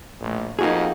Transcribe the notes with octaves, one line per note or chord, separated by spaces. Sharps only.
A#1 A2
F2 F3 A#3 D#4 F4 F#4 G#4